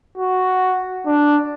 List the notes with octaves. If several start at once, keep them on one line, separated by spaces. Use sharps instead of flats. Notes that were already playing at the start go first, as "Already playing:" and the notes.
F#4
D4